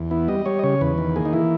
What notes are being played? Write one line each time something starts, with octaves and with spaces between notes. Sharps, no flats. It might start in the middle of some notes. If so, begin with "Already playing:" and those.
Already playing: E2
B3 E4
G3 D#5
G3 C#5
D#5
C#3 C#5
E2 B4
D#3
A#3 G#4
D#4
E3 E4